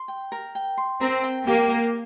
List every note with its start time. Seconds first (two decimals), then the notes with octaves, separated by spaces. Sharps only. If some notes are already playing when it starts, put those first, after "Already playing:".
Already playing: C6
0.08 G5
0.32 A#4
0.55 G5
0.77 C6
1.01 C4 A#4
1.23 G5
1.46 A#3 G4
1.69 G4